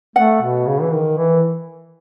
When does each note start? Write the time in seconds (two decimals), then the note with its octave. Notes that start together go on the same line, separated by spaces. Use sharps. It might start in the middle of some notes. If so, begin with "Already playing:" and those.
0.16 A3 F#5
0.42 B2
0.67 C#3
0.82 E3
0.93 D#3
1.17 E3